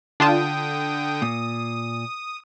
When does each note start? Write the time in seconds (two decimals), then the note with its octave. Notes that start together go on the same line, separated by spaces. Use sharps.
0.20 D3 D4 F4 G5 A5 D#6
1.22 A#2 D#6